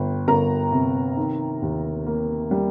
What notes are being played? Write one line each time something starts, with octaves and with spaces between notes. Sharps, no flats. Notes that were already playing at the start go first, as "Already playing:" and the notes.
Already playing: G1 G5
G1 A#4 A#5
C3
D#3
D#2
A#3
G3